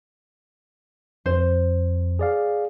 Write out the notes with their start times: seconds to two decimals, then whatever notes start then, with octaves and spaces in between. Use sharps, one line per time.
1.26 F2 C5
2.19 G#4 D5 F5